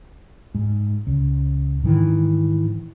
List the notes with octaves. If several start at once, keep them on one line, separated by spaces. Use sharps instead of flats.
G#2
C#2
G#2 D#3 E3